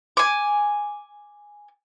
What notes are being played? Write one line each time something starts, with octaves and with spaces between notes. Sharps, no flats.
G#5 D6